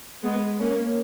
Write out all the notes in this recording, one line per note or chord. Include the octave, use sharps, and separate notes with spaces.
G#3 B3
A#3 C#4